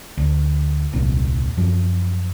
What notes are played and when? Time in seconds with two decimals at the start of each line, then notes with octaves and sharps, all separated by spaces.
0.17 D2
0.93 D#1 C2 A#2
1.57 F#2 F3